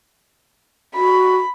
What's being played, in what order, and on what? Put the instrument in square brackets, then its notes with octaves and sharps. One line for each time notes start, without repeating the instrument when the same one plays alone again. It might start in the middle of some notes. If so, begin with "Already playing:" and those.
[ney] F#4 [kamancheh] B5